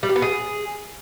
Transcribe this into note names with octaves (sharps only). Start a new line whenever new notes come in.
G3
G4
B3
G#4